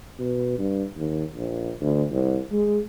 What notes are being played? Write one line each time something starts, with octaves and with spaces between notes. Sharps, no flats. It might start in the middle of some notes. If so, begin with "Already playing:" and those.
B2
G2
D#2
A#1
D2
C2
G#3